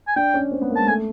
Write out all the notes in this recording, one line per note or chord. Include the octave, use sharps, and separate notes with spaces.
G#5
D4 G5
C#4
C4
B3
A#3
G#3 A5
A3 G#5